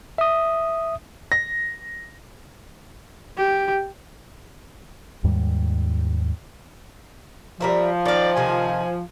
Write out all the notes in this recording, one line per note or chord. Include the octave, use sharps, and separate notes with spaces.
E5 D#6
A#6
G4
D#2 G#2 G3
F3 G3 A#4 E5
D#3 D5 F5
C3 D#3 A3 G#5